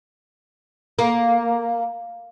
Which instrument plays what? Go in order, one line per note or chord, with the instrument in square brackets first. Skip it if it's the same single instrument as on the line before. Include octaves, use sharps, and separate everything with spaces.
[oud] A#3